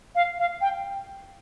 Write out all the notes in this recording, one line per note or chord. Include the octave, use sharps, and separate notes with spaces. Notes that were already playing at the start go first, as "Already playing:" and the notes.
F5
F5
G5